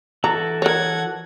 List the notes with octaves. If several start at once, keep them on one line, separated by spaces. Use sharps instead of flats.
E3 F#4 A4 A#5
A#4 C#5 F#5 G#6